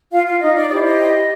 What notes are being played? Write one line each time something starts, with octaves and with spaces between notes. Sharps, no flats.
F4 F5
F4 F5
D#4 D#5
D5
E4 G4 C5 D5
D#5